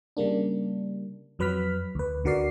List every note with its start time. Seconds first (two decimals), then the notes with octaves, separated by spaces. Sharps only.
0.17 C#3 G3 A#3 D4
1.39 F2 F#3 B4 B5 F6 B6
1.95 D2 B4
2.24 D2 D3 F#4 A#4 D5 C7